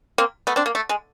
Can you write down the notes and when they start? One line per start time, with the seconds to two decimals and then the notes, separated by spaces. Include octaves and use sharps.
0.18 A#3 C4
0.47 A3 B3
0.56 C4 D4
0.66 A#3
0.75 A3
0.89 G#3